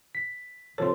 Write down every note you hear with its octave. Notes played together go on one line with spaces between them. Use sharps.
B6
C3 F3 A4 C#5 C6